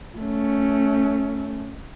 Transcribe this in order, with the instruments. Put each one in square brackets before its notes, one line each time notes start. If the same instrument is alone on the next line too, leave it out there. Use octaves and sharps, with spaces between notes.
[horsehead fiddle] A3 C#4